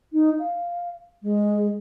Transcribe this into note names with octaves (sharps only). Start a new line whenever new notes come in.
D#4
F5
G#3